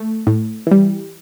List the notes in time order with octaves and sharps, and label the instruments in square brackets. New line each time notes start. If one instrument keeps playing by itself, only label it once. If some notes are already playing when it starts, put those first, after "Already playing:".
Already playing: [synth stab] A3
A2
E3 G3